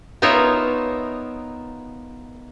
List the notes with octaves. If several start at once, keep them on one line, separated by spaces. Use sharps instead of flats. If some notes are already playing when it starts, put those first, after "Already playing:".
B3 D#4 F4 A#4 C#5 E5